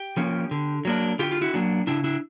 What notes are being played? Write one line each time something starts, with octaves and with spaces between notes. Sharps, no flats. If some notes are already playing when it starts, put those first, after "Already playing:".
Already playing: G4
F3 A#3 C#4
D3
F#3 A#3 D4
D3 F4 G4
F4
E4 F#4
F#3 A#3 D4
C#3 D4 E4
D4 E4